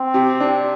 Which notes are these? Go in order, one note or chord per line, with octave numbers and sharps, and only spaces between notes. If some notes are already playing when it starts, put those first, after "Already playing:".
Already playing: C4
C3
D4